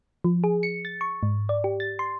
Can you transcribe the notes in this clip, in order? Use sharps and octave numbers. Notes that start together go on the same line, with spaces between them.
F3
G#4
C#7
A6
C#6
G#2
D5
G4
A6
C6